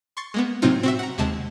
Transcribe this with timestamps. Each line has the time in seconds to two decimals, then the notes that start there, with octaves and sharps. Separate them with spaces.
0.17 C6 C#6 A6 C7
0.34 G#3 A#3 B3
0.62 A2 C3 F#3 C4 D#4 F4
0.83 C4 F#4 E5
0.99 F#5 A#5
1.18 D#2 C3 G#3 A5